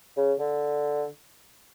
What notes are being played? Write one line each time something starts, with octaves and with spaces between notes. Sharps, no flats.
C#3
D3